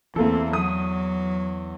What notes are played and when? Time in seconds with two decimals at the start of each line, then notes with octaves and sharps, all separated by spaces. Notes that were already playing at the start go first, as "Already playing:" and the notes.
0.16 E2 E3 A3 A#3 C4 A4
0.53 F#3 D#6